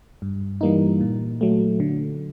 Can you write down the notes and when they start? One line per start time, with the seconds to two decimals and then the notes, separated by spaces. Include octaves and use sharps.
0.22 G2
0.61 E3 G3 A#3 D#4
1.01 A#2
1.41 F#3 A3
1.80 D3